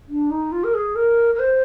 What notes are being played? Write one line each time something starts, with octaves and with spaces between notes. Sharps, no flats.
D4
D#4
F4
A#4
G#4
A#4
A#4
C5